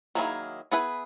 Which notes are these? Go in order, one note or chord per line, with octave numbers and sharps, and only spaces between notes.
D#3 F#3 A#3 E4 G#4
B3 E4 G#4 B4